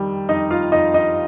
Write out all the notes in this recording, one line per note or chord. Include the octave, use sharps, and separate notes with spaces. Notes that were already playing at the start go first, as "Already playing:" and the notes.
Already playing: F2 D#3 G3
F2 D#4 D#5
F4 F5
F2 D#4 D#5
D#4 D#5